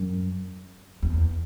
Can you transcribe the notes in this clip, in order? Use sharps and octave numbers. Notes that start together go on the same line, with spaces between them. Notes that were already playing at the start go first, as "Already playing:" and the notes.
Already playing: F#2
E2